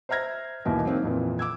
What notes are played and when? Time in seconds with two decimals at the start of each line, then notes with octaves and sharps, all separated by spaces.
0.09 C5 E5 A#5 F6 G#6 A#6
0.65 D#2 B2 E3 A#3
0.85 F#3 A#3 C4 D#4
1.03 F2 A#2 E3
1.39 D6 E6 G#6